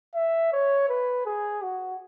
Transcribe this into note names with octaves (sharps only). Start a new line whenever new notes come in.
E5
C#5
B4
G#4
F#4